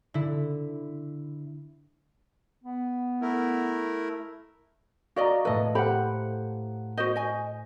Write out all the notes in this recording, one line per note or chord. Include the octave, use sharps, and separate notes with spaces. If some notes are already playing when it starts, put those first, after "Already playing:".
D3 E4
B3
A3 E4 A#4
F#4 D5 D#5 F5 A#5
A2 A3 A4 B4 D#5
G4 A4 C5 F#5 B5
F#4 C5 D#5 G6
D#5 G#5